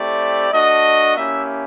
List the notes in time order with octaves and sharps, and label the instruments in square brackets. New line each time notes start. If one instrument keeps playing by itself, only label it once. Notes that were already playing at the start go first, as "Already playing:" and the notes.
Already playing: [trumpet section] A3 C4 E4 G4 D5
A3 D4 F#4 D#5
A#3 C#4 E4 G4 E5